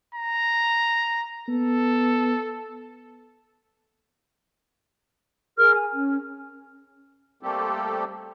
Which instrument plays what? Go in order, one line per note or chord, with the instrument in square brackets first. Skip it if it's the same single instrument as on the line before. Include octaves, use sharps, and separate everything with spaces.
[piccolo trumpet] A#5
[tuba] B3 [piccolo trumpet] A4
[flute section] G#4 A#4 F6
G#5
C#4
[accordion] G3 A3 A#3 C4 G4 A4